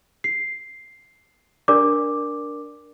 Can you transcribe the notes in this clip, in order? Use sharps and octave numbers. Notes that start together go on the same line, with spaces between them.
C7
D4 A#4 D5 D6